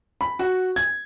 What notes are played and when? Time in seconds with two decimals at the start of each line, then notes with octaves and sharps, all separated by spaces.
0.21 B5
0.39 F#4
0.76 G#6